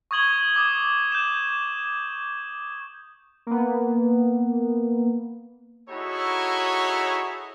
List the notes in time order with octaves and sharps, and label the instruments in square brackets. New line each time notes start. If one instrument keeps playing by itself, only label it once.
[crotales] C#6 D#6 G#6 F#7 G7
D6 D#6
G6 E7
[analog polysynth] A#3 B3
[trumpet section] D#4 E4 F#4 G#4 A4 C#5